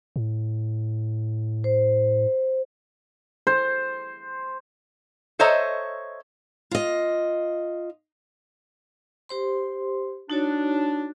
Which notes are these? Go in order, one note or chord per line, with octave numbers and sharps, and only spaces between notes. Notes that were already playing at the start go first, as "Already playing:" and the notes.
A2
C5
C5
A4 C5 C#5 D#5 E5 A#5
F4 D#5
G4 C5 C6
D4 D#4 F#4 C#5